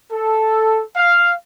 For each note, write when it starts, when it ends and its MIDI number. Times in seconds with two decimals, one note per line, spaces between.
0.12 0.82 69
0.96 1.33 77